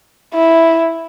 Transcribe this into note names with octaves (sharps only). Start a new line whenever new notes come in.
E4